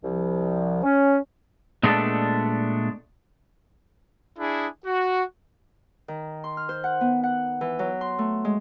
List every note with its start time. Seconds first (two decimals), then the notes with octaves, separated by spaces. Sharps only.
0.03 C2 F3
0.83 C#4
1.83 A#2 G#3 A3 B3 D4 A4
4.39 D4 E4 G#4
4.85 F#4
6.08 D#3
6.44 C6
6.57 F6
6.69 C5
6.84 F#5
7.01 B3
7.24 F#5
7.61 E3
7.79 F#3
8.01 C6
8.19 A3
8.45 G#3